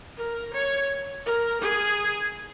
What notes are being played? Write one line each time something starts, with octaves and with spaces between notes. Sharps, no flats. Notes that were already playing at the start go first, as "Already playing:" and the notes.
A#4
C#5
A#4
G#4